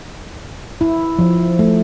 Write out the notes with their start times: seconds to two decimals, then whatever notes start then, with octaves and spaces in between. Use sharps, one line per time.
0.81 E4
1.19 F3
1.59 A3